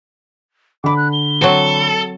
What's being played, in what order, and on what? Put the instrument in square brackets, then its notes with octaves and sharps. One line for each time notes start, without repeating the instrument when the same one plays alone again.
[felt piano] D3 B5 [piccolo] D6
[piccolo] F#6
G7
[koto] F#3 C4 [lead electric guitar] A4